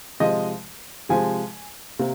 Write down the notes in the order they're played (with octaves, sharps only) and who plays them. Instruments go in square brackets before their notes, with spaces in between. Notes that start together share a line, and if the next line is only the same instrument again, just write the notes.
[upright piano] C3 F3 G#3 D#5
C3 F3 G#3 G#5
C3 A#3